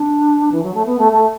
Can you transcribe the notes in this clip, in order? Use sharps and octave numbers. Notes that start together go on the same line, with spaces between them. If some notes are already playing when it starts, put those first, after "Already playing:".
Already playing: D4
E3
F#3
A3
B3
A3
A3